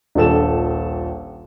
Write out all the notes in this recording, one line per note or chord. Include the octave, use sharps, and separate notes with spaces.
D#1 A#1 A4 E7